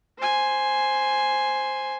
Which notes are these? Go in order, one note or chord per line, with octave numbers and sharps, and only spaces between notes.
C5 G#5